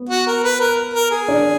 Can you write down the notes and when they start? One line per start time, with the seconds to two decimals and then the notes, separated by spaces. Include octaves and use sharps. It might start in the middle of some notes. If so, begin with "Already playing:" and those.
Already playing: B3
0.09 F#4
0.27 A#4
0.44 B4
0.60 A#4
0.94 A#4
1.11 G#4
1.28 D4